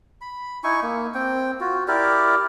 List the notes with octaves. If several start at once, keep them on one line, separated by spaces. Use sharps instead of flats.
B5
D#4 E4 G#5 C#6
A#3
C4 G5
F4 F#4
E4 G4 A#4 D5